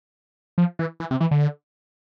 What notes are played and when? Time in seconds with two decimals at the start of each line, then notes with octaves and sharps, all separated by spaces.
0.58 F3
0.79 E3
1.00 E3
1.11 C3
1.20 E3
1.31 D3